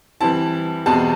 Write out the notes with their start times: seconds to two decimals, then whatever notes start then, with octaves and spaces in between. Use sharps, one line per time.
0.21 E3 G3 C4 E4 A5
0.86 E2 B2 G3 C4 F#4 A5